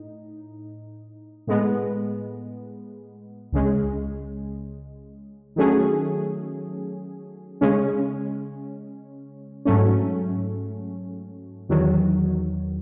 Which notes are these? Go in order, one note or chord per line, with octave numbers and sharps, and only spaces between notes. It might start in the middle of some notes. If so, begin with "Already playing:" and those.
Already playing: A2 D#4
A2 G#3 B3
C#2 C#3 G#3
D#3 F#3 A3 C#4 G#4
C#3 G#3 C#4
G#2 F#3 A3 C#4
E2 D#3 F#3